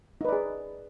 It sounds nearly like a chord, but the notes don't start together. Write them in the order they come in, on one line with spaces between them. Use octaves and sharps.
D#4 B4 D5 G#4